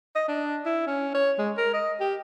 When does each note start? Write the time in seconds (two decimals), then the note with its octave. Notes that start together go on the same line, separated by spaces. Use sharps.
0.15 D#5
0.28 D4
0.66 E4
0.87 C#4
1.15 C#5
1.39 G#3
1.58 A#4
1.74 D#5
2.00 G4